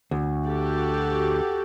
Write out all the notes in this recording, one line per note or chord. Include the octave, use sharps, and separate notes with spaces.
D2
F#4 G4 A4